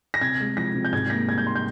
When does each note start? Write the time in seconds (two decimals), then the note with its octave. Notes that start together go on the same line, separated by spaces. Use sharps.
0.14 A#6
0.21 C3 G#6
0.40 G#3
0.57 F3 A#6
0.74 C3
0.85 G6
0.93 G#2 G#6
1.10 A#3 A#6
1.29 G3 G#6
1.38 G6
1.47 C6
1.55 G6